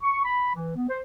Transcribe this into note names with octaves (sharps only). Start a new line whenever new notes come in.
C#6
B5
E3
B3
C5